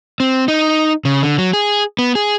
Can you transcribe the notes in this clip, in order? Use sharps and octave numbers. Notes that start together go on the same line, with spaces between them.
C4
D#4
C#3
D3
F#3
G#4
B3
G#4